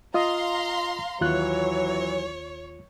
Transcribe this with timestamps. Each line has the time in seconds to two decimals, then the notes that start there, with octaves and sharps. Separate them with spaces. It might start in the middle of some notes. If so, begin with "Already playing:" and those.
0.14 F4 D#5 F5 A#5 C6 D#6
1.21 D#2 E3 F#3 F4 C#5 F#6